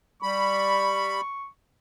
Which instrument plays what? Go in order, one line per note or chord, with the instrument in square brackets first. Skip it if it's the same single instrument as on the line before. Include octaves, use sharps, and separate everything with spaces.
[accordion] G3 B5 [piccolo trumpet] C#6